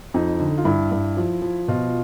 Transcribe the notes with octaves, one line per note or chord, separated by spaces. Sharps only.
F2 D#4
D3
F4
G2 E4
G2
F3
F3
B2 F4